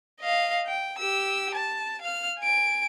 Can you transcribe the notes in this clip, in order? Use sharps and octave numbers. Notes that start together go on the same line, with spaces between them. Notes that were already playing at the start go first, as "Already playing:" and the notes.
D#5 F5
G5
G4 E6
A5
F5 F6
G#5 D7